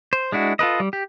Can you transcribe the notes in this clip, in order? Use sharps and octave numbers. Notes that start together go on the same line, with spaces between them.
C5
G#3 D4 E4 F#4
F4 A4 B4 D#5
G3
G4